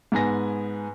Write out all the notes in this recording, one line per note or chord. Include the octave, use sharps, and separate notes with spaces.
G#2 B3 G#5 A#6